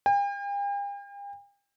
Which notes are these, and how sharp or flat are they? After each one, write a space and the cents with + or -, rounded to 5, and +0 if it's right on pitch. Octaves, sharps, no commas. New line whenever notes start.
G5 +45